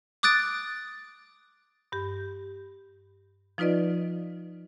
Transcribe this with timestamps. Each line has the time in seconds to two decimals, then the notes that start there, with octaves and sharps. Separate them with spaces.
0.23 D6 D#6 F#6 A6 D7
1.92 G2 G4
3.58 F3 D#4 F4 B4 D5 D#5